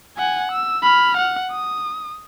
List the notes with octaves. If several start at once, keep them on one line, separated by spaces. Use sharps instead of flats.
F#5 G#5
E6
B5 F6
F#5
D#6